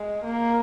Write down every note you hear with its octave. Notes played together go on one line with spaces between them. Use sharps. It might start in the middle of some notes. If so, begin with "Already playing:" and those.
Already playing: G#3
A#3